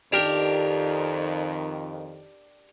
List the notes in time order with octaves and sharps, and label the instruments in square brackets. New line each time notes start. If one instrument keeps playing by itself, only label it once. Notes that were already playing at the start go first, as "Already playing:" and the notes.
[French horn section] F2 D#3 [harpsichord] D4 G4 A#4